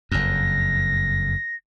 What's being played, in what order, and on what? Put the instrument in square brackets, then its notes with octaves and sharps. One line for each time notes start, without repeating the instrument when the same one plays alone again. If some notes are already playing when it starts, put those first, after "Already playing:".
[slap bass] F#1 F2 [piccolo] A#6